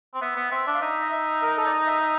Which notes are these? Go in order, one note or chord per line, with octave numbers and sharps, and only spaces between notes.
C4
B3 E5
B3
C4 E5
D4
F5
D#4 E5
D#5
E5
A#4
A4
D5
D#5
E5
E5